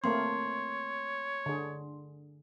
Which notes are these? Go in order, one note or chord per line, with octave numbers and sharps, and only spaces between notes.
A3 A#3 C4 C#5 C6
D3 G#4